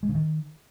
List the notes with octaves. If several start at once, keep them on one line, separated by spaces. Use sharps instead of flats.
G#3
C#3
D#3